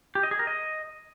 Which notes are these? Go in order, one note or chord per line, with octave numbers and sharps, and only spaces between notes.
G4
D#5
G#4
A#4
D#5